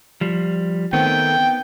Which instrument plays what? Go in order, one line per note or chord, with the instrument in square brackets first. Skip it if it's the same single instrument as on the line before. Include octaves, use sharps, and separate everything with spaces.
[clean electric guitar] F3 G3
[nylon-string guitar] D#3 A3 C4 [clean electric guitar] B3 [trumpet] G5